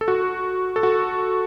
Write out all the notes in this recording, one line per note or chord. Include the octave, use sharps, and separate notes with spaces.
A4
F#4
A4
F#4